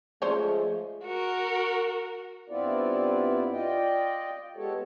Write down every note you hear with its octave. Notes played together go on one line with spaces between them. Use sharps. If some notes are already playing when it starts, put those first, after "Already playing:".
F3 G#3 A3 C#4 G#4 C5 D5
F#4 A#4
G2 B3 C4 E4 F4 D5
F4 D5 D#5 G5
G#3 B3 G4 A4 C#5